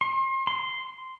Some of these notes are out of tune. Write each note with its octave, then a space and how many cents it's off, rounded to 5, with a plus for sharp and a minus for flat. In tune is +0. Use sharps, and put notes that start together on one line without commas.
C6 +35
C6 -10